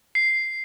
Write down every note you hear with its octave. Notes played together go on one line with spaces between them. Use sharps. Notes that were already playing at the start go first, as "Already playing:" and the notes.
C7